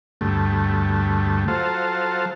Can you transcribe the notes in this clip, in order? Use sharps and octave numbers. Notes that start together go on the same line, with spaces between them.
D2 G2 A3
F#3 F4 A4 C5